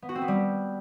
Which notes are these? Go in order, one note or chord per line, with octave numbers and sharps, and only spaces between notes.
B3
F#4
C4
B3
G3